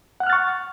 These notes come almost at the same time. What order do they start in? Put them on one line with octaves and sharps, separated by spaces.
F#5 F#6 F6 A6 C#6